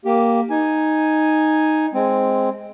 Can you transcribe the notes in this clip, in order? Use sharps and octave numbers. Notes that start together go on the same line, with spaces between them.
A#3 G4
D#4 G#5
G#3 C4